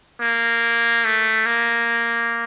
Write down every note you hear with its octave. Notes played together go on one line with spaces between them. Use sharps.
A#3
A3
A#3